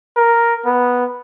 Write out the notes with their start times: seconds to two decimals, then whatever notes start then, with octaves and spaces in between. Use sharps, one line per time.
0.17 A#4
0.65 B3